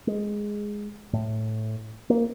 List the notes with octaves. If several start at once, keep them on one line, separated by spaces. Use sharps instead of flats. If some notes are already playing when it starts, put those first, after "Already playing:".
G#3
A2
A#3